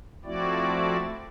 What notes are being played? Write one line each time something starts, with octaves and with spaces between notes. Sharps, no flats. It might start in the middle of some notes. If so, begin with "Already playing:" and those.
F3 A3 C4 E4 F#4 D5